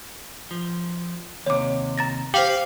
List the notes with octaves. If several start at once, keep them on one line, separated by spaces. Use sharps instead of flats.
F3
D#2 C3 C#5 D6
A#5 A6 A#6
G4 C5 F5 F7 G7